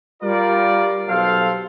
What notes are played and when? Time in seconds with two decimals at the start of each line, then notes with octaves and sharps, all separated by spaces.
0.23 G3 F4 A#4 D5
1.08 B1 F#3 G4 A4 C5 F5